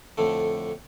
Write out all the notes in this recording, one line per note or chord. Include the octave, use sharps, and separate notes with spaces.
F2 A2 D3 A3